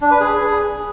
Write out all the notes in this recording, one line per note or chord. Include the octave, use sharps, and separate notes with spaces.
D4
B4
G#4